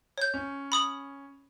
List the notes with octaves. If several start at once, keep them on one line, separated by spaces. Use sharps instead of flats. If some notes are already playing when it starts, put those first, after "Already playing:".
C#5 G6
C#4
B5 D#6 F#7